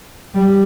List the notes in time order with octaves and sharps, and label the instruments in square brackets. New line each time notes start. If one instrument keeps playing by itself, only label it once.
[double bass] G3